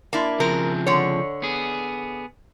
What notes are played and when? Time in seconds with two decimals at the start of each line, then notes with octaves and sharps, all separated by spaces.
0.13 A#3 D4 E4
0.40 C#3 F3 C4 A#4
0.86 D3 C#5
1.42 B3 G#4